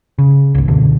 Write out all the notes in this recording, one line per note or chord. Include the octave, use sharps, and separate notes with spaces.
C#3
G#1 C#2
C#2 F#2 B2 D3